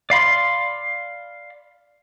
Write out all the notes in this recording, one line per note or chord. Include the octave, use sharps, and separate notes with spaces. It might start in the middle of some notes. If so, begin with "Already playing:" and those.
D5 F5 B5 C6